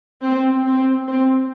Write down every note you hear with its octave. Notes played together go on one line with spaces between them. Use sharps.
C4
C4
C4